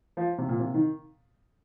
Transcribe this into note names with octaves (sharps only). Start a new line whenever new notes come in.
F3
C3
A#2
C3
D#3